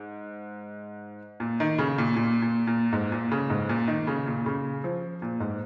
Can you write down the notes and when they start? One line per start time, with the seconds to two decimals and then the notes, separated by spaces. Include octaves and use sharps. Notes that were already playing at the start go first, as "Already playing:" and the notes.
Already playing: G#2
1.40 A#2
1.60 D#3
1.78 C#3
1.98 A#2
2.16 A#2
2.42 A#2
2.67 A#2
2.93 G#2
3.12 A#2
3.32 C#3
3.50 G#2
3.69 A#2
3.88 D#3
4.07 C#3
4.27 A#2
4.46 C#3
4.84 F3
5.22 A#2
5.40 G#2